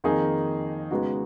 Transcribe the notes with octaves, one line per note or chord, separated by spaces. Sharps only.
F2 D#3 A#3 D#4 G#4
C#3 G#3 B3 D#4 F#4